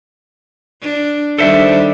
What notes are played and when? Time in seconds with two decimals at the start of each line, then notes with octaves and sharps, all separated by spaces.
0.82 D4
1.38 D#3 G3 D4 A4 C5 E5